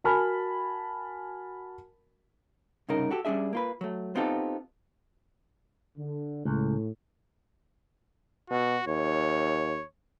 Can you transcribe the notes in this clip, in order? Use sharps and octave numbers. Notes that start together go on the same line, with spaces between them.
F#4 A#4 G#5 A5 B5 F6
C2 G2 C#3 D#4 A#4
F#4 G4 A4
G3 C#4 D4 G#4 E5
A#3 F4 B4
F#3 A3
B3 C4 D#4 F4 G4 A4
D3
C#2 A2
B2 F#4
D#2 C#5